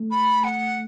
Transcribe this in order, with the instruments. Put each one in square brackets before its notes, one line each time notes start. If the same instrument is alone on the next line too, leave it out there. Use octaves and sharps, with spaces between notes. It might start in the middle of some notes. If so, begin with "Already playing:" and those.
Already playing: [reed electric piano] A3
[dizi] B5
F#5